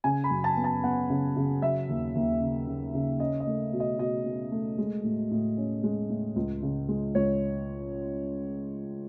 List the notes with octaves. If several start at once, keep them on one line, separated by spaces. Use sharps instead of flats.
C#3 G#5
B5
F#2
A5
B3
A5
B3 F#5
C#3
C#3
F#3 E5
D#2
D#2
C#3
C#3
C#3
C#4 D#5
D#5
A3
B2
D#5
B2 D#5
B2
A3
G#3
A2
A2
C#4
G#3
A2
C#2
C#3
G#3
C#2 C#5